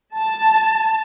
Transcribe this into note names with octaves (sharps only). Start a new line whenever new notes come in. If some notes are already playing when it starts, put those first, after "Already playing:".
A5